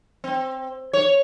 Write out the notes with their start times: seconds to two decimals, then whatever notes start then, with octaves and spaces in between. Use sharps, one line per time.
0.24 C4
0.93 C#5